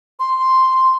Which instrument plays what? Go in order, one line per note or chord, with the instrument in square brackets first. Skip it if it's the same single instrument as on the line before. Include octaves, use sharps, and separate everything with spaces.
[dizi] C6